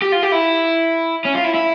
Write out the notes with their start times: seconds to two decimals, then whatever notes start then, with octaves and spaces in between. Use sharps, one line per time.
0.02 G4
0.12 F4
0.23 G4
0.32 E4
1.25 C#4
1.35 F4
1.44 E4
1.54 E4